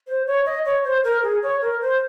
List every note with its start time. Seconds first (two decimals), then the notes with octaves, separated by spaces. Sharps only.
0.07 C5
0.27 C#5
0.46 D#5
0.65 C#5
0.84 C5
1.04 A#4
1.23 G#4
1.43 C#5
1.61 A#4
1.81 C5